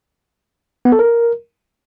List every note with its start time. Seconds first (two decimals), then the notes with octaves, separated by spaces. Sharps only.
0.85 B3
0.92 A4
0.99 A#4